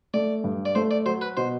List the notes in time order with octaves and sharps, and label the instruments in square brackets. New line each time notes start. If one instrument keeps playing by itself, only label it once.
[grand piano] A3 [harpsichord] D5
[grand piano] G2
[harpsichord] D5
[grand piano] A3 [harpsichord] C5
[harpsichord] D5
[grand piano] F#3 [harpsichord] C5
[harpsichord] B4
[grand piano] B2 [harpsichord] C5